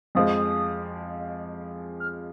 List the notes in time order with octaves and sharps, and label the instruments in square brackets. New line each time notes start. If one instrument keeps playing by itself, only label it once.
[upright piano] F2 F3 G#3 [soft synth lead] D#6
[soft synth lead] F6